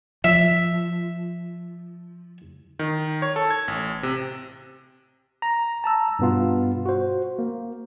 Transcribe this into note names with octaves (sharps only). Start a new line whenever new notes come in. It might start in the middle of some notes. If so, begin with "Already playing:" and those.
F3 E5
D#3
C#5
A4
G#6
A1
C3
A#5
A5 A#5 E6
G2 B2 B3 F4
F#4 C5
A#3